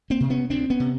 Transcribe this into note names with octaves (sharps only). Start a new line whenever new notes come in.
A#3 C4
C3
B3 C#4
D2 C4 D4
B3 C#4
C3